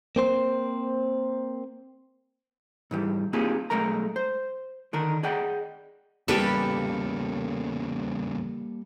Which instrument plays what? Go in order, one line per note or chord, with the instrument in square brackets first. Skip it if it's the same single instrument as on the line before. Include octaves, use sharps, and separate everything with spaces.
[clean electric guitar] A#3 C4 C5
[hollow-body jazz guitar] G#2 E3 G3
A#3 C4 D#4 F4 G4 G#4
B1 F#2 G#3 A3 A#4 A#5
C5
D3 D#3 D4 D#4 A#4
G#4 D5 D#5 F#5 G5
[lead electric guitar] E2 C#3 [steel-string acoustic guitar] G3 A#3 A4 [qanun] G4 B4 E5